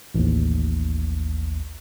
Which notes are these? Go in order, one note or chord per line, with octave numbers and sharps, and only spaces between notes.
A1 D#2